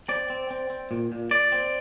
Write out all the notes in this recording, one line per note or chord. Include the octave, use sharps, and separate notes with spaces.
C4 D5
C4
C4
C4
A#2
A#2
A#2 D5
C4